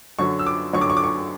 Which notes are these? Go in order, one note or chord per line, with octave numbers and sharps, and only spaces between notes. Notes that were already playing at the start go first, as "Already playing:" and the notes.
F#2 D3 F#3 C#6
E6
D6
F#2 D3 F#3 C#6
D6
C#6
D6
C#6